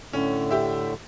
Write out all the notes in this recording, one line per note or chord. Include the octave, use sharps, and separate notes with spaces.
A2 D3 C#4
G4 E5